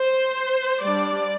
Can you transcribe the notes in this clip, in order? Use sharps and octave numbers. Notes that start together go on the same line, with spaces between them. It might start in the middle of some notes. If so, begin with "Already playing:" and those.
Already playing: C5
G3 D4 D5